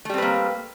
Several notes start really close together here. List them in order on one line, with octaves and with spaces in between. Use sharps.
A3 G3 C4 B4 A#3